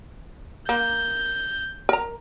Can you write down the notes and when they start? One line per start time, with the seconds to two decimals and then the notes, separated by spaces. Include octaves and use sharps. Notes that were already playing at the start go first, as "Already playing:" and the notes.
0.69 A#3 G6
1.89 A#4 A#5